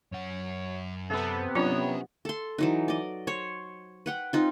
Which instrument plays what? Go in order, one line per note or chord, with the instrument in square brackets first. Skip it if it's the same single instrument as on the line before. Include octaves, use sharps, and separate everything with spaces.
[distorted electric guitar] F#2 F#5 [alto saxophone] C#5
[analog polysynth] C3 B3 [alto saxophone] A4
[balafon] F#3 D4 F4 [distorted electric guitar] C#4 A#5 [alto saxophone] C#5
[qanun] A4 C6
E3 F#3 D#4
D5 D#5
C5 C#5
B4 F#5 G5
C4 D#4 F4